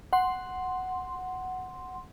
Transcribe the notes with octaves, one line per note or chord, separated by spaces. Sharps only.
F#5 C6